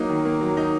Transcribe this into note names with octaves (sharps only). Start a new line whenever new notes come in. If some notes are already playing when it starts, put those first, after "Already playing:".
Already playing: F#3 A#3 D#4
D#3
A#3
F#3
D#4